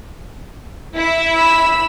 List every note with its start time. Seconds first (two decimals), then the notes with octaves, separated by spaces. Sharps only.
0.95 E4 E5
1.33 B5 E6